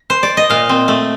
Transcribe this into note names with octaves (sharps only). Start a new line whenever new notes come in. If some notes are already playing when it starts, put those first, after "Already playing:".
Already playing: A#4
C5
D5
D#5
A#2 F5
C4
A3